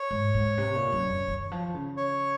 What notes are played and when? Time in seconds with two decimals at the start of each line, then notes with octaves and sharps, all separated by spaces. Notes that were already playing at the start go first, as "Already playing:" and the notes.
Already playing: C#5
0.11 G#2
0.34 G#2
0.58 C3
0.75 A#2
0.92 F#2
1.10 F#2
1.28 D#3
1.52 F3
1.74 C#3
1.97 C#5